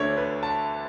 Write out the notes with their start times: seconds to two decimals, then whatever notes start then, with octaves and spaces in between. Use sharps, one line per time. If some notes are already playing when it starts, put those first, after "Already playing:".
Already playing: D2 D3 A3 D4 C#5
0.17 B4
0.43 A5